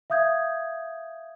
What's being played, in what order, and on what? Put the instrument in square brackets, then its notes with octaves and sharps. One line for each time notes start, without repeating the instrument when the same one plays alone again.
[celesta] E5 F5 D#6 G6 G#6